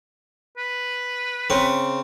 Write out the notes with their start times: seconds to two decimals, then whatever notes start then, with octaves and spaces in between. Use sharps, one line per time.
0.58 B4
1.50 C#3 C4